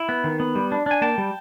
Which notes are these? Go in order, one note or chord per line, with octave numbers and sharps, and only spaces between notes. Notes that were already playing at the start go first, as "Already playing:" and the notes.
Already playing: E4
B3
D#3
B3
G3
D4
D4 G#5
A#3 G5 A5
G3